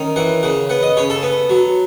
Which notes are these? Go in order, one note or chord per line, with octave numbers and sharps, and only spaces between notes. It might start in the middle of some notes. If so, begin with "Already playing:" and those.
Already playing: D#3 C#4
E3 F#5
C#3 F#5
B3 F#5
D#5
C#3 C#5
A4
B3
F#3